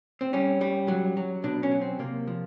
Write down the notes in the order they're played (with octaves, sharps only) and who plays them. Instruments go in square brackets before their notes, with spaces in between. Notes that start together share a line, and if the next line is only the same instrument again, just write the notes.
[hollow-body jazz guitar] C4
G3 C#4
G3
F#3
F#3
B2 D4
C#4
F#3
C4
C3 A#3
F3